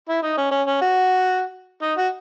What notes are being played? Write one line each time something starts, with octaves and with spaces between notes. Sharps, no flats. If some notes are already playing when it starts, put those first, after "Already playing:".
E4
D#4
C#4
C#4
C#4
F#4
D#4
F#4